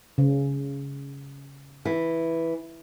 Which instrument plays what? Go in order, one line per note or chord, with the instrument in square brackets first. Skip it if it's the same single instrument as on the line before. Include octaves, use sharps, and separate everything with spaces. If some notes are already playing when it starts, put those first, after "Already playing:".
[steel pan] C#3
[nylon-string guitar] E3